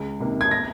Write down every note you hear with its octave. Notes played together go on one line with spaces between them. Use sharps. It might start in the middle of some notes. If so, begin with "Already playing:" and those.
Already playing: C#2
C3 D#3 A#3
G#6
A#6